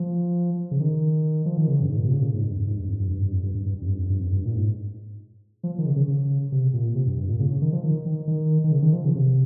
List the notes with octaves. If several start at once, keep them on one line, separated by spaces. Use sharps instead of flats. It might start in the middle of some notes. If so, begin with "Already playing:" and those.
Already playing: F3
C#3
D#3
F3
D#3
C#3
G2
G#2
A#2
C3
C#3
A#2
G#2
G2
F2
G#2
G2
F2
G2
G2
G2
F2
G2
G2
G2
F2
G2
F2
G2
F2
G2
A#2
G#2
F3
D#3
C#3
C#3
C#3
C3
A#2
C3
G2
G2
A#2
C#3
C#3
D#3
F3
D#3
D#3
D#3
D#3
C#3
D#3
F3
C#3
C3